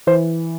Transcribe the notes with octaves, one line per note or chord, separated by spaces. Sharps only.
E3 C5